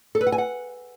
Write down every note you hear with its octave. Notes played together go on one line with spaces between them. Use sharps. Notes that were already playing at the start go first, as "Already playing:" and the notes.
A4
B4
F#5
G#5
F#5